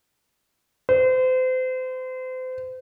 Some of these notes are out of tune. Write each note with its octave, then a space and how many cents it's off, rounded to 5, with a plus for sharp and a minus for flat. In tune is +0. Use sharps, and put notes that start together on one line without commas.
C5 -35